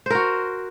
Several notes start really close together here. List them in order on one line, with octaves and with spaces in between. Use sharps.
C5 A#4 F#4